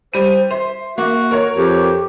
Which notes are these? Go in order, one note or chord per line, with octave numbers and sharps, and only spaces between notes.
G3 C5 D#7
C5 E5
A#3 F#4
A#4 C#5
F2 G4